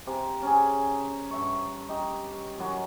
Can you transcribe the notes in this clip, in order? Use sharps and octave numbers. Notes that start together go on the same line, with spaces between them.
C3 G4 C5 A#5
C#4 G#4
G2 E5 C#6
D#4 G4
F#2 F#3 F#4